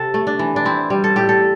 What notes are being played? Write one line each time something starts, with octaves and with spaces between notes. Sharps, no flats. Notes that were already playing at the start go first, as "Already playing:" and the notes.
Already playing: C3 A4
A3
D4
E3
D4
C4 E4
G3
A4
A2 G4
A4